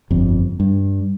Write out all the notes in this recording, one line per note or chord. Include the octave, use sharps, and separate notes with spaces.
G1 F2
G2